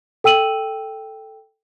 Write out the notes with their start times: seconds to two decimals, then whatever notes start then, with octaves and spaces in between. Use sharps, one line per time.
0.24 A4 G5 E6 D#7 F#7